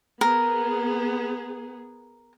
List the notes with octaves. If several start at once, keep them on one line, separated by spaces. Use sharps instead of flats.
B3 G#4 A#4